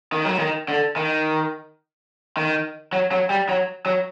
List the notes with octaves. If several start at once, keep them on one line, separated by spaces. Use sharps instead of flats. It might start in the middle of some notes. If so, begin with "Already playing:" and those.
D#3
F#3
D#3
D3
D#3
D#3
F#3
F#3
G3
F#3
F#3